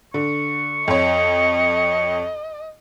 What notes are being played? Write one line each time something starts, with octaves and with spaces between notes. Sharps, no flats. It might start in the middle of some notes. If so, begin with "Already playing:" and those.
D3 C#6
F2 C#5 D#5